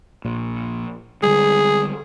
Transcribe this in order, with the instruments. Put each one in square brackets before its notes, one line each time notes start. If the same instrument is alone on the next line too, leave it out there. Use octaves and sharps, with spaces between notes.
[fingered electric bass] A#1 A#2
[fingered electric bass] D3 G3 G#3 [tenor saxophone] G#4